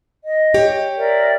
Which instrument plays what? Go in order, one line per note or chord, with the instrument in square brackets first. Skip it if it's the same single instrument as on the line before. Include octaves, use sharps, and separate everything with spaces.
[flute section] D#5
[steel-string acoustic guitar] G4 C#5
[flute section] A#4 D5 E5